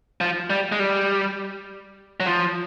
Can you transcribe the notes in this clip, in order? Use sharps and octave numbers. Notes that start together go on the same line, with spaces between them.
F3
G3
G#3
G3
F#3
F3